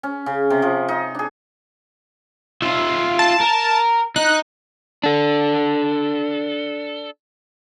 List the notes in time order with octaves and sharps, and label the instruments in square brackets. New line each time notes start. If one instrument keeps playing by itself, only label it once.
[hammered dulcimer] C#4
C#3
C3
F3
D#4
D4 G#4
[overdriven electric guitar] F4 E5
[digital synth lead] A5
[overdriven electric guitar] A#4
[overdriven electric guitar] D#4 [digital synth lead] F#6
[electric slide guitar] D4 A4